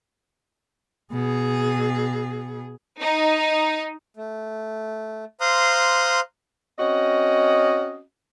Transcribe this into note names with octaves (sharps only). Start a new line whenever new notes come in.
B2 G#4
D#4
A3
C5 F5 A#5 C6 D#6 F#6
C4 C#4 F#4 D#5